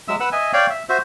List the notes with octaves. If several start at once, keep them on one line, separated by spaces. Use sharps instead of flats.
F#3 G#3 E5 E6
B4 F#5 E6
D#5 E5 G#5
C#5 D5 F5 G5
E5
F#4 C5 E5